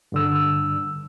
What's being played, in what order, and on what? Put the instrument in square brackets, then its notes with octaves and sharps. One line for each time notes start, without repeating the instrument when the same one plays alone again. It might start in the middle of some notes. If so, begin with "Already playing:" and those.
[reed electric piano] G2 D3 E6